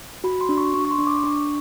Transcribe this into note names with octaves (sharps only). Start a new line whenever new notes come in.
F#4 B5
C6
D4
C#6
D4 C#6
C#6
C6
D4
D6
D4 C#6